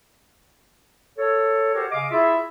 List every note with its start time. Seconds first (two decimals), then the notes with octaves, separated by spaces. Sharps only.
1.18 A4 C#5
1.74 F#4 G4 A4 A#4 C5 C#5
1.91 C#3 G#4 D#5 F5 D6
2.11 E4 F4 G#4 E5